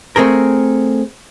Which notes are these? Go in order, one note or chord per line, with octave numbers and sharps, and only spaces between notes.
A3 C4 G#4 A#4